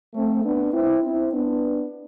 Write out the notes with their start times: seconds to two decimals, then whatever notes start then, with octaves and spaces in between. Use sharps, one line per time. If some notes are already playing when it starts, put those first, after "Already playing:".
0.14 A3 C4
0.44 B3 D4
0.73 C4 E4
1.02 C4 E4
1.32 B3 D4